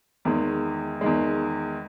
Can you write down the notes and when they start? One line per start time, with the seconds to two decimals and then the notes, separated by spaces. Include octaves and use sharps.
0.25 E2 D#3 G#3
1.01 E2 D#3 G#3